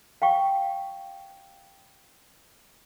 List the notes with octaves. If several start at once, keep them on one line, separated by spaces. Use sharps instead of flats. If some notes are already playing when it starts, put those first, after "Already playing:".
F5 G5 C#6